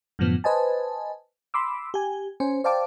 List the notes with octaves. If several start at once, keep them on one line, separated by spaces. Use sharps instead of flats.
F#2 A2 D3 F3 B3
B4 C5 D#5 G#5 A5
B5 C6 D6 E6
G4 G#5
C#4 C5 G#5
C5 D5 F5 G5 A5 D6